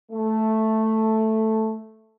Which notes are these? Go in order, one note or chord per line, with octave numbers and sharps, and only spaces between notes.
A3